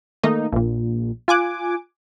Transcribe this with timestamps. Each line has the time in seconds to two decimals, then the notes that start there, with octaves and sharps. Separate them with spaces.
0.23 D#3 A3 A#3 D#4
0.52 A#1 A#2
1.28 F4 G#5 D6 F#6